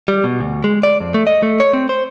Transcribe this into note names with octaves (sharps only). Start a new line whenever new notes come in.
G3
B2
D2
G#3
D5
F2
A3
D#5
A3
C#5
C4
C5